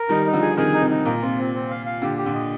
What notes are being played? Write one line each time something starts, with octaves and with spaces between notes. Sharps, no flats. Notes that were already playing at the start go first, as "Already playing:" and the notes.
Already playing: A#4
D#3 G3 D#4
D#4
D3 F3
G#4
C3 D#3 G#4
D#4
C3
D#4
A#2 A#4
C3 F4
C4
C4
F5
F5
A#2 D3 G4
G4
A#2 D3
D#5